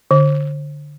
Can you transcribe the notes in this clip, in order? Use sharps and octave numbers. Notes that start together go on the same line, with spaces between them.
D3